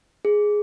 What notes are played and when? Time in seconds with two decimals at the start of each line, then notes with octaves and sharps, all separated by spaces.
0.25 G#4